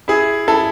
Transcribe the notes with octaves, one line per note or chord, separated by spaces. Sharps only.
E4 G#4
E4 A4